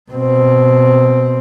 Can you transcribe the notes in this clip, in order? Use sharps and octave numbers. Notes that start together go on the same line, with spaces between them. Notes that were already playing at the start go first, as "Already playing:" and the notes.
B2 C4